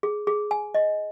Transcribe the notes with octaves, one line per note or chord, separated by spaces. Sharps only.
G#4
G#4
G#5
D#5